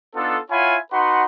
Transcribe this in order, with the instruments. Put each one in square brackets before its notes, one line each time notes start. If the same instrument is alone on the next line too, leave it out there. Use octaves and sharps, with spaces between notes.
[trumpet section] B3 D4 D#4 F4 A4
E4 F4 C#5 F#5 G#5 B5
D#4 F#4 B4 F#5 C6